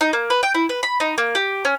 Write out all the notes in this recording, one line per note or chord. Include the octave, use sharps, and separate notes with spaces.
D#4
A#3
B4
G5
E4
B4
B5
D#4
A#3
G4
C#4